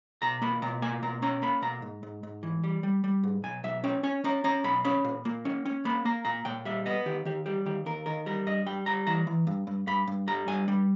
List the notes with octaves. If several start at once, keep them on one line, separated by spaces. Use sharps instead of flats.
B2 A#5
A#3 B5
B2 A#5
A#3 G#5
B2 A#5
C#4 A#5
A#3 B5
B2 A#5
G#2
G#2
G#2
E3
G3
G3
G3
G#2
B1 G#5
B1 E5
C#4 G5
C#4 G#5
C#4 A#5
C#4 A#5
B1 B5
C#4 B5
A#2
A#3
C#4
C#4
A#3 B5
A#3 A#5
A#2 A#5
A#2 G5
G3 E5
B3 D#5
D#3 G4
D#3 G4
G3 G4
D#3 G4
D#2 A#4
D#3 A#4
G3 A#4
G2 D#5
G3 G5
G3 A#5
E3 A#5
E3
G2
G2
G2 B5
G2
G3 A#5
G2 G#5
G3